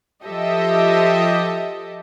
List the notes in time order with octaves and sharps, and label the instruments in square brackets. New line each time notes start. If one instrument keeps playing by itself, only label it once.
[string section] F3 G4 A4 D#5 E5